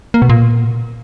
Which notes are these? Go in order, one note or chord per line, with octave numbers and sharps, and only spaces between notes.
A#3
B2
A#2